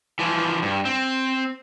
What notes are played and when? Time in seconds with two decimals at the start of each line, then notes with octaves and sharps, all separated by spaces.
0.19 E3 F3
0.62 G2
0.85 C4